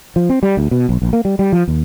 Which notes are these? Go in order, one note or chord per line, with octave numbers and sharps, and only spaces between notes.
F3
C4
G3
D2
B2
B1
A#1
A#3
G3
G3
F3
D#2